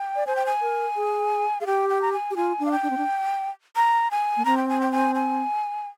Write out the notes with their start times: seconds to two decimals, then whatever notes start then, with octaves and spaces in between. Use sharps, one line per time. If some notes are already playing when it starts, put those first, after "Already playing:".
Already playing: G5
0.16 D5
0.26 C5 G#5
0.36 G5
0.46 G#5
0.62 A#4
0.96 G#4
1.61 G#4 F5
1.66 G4 G5
1.89 G5
2.02 A#5
2.13 G#5
2.31 G4
2.36 F4 G#5
2.59 D4
2.66 F5
2.72 G5
2.83 D4
2.90 C4
2.97 D4
3.76 A#5
4.11 G#5
4.37 A#3
4.45 C4 A#5
4.57 G5
4.69 G#5
4.81 G5
4.92 G#5
5.15 G#5